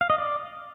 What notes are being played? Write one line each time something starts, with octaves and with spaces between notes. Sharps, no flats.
F5
D#5
D5